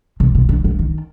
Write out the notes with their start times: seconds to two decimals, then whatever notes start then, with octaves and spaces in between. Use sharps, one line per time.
0.20 C3
0.35 C3
0.49 D3
0.64 F3
0.79 D#3